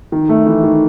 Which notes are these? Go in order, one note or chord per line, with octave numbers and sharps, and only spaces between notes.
D#3
A3
E3
D#3